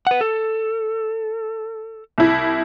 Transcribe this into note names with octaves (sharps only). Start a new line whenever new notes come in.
B4 F#5
A4
C2 E4